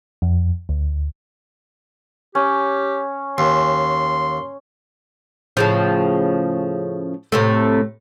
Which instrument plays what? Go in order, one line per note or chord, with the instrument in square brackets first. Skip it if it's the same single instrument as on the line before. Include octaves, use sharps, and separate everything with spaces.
[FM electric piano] F2
D2
[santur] C#4 [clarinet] G4
[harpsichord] D#2 [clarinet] C6
[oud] A2 C#3 F3
A2 C3 A3